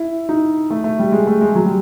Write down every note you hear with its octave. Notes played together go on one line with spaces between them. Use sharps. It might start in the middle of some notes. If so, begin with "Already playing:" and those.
Already playing: E4
D#4
A3
A3
G3
G#3
A3
G#3
F#3
G3